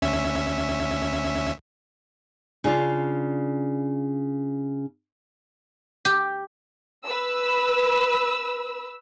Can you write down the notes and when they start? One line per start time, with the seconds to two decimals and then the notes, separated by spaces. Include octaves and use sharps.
0.02 D2 C#4 E5
2.64 C#3 D4 F4
6.05 G4
7.05 B4 E6